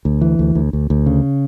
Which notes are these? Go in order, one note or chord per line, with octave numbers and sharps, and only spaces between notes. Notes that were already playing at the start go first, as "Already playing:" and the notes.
D2
E3
D2
D2
D2
D2
C#3